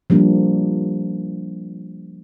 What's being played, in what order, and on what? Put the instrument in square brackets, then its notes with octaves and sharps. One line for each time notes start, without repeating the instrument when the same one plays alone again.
[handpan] F3 G3 A#3 D4